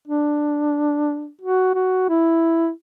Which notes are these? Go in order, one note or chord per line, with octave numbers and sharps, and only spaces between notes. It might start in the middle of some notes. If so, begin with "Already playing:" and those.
D4
F#4
F#4
E4